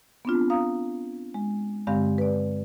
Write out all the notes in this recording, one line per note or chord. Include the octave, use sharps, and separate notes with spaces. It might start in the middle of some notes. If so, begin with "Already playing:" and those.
B3 C4 D4 F4
F5 A#5 D#6
G#3
G2 D3 G#3 C4 G4 F5
B4 D5